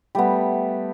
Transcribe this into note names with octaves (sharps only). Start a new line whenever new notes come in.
G3 A3 B3